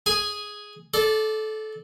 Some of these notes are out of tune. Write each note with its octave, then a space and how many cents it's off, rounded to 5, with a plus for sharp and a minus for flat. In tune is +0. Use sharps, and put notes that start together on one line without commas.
G#4 +0 G#5 +0
A4 -20 D5 +0